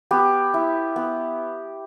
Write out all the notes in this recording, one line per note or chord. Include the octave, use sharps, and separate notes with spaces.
B3 G4
E4
B3